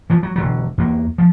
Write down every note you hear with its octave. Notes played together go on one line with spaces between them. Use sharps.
E3 F3
F#3
E1 D3 F#3
E2 A#3
F3